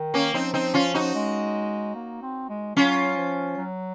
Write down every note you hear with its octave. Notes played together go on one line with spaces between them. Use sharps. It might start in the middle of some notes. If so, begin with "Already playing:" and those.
Already playing: D#3
A#3 C#4
F3 C4 D#4
C4 D#4
C#4 F4
D#4 F#4
G#3
A#3
C4
G#3
F#3 C#4 F4
F3
F#3